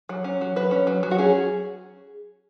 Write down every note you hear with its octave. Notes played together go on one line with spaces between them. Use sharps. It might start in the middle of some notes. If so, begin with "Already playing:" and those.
F#3
C#4
F#3
F#3 B4
C#4
F#3
F#3
F#4
C#4 G#4